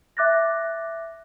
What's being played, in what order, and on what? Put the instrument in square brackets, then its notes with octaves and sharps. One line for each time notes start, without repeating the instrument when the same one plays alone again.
[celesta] E5 D6 F#6 A6 A#6